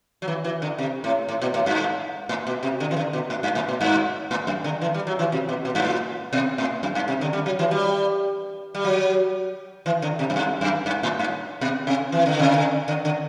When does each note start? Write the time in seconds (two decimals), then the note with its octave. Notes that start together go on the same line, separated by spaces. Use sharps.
0.22 F#3
0.28 E3
0.44 E3
0.62 D3
0.78 C3
1.04 A2
1.28 A2
1.42 B2
1.54 A2
1.66 G2
2.29 A2
2.47 B2
2.63 C3
2.80 D3
2.91 E3
2.97 D3
3.13 B2
3.30 A2
3.43 G2
3.55 A2
3.69 B2
3.81 G2
4.31 A2
4.47 F#2
4.64 D3
4.82 E3
4.94 G3
5.07 F#3
5.19 E3
5.32 C3
5.49 B2
5.65 B2
5.75 G2
5.82 A2
6.33 B2
6.58 A2
6.83 F#2
6.95 G2
7.08 C3
7.21 D3
7.33 G3
7.46 F#3
7.59 E3
7.71 G3
8.74 G3
8.84 F#3
9.86 E3
10.02 D3
10.19 C3
10.30 F#2
10.36 G2
10.61 F#2
10.86 G2
11.03 A2
11.19 G2
11.61 B2
11.87 C3
12.12 E3
12.26 D3
12.40 C3
12.54 D3
12.88 D3
13.05 D3